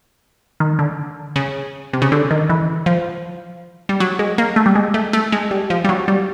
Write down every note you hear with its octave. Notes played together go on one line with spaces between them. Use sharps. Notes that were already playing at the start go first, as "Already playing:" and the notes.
D#3
D3
C#3
C3
C#3
D3
D#3
E3
F3
G3
F#3
G#3
A#3
A3
G3
G#3
A3
A3
G#3
G3
F3
G3
F#3
G3